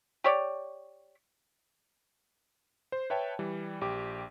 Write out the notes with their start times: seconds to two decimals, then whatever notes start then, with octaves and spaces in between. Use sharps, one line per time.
0.24 G4 C#5 D5
2.92 C5
3.10 B4 C#5 E5 G5 A5
3.39 E3 G3
3.81 A#1 G4 D6